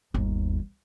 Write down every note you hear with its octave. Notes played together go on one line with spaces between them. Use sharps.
G1 D#2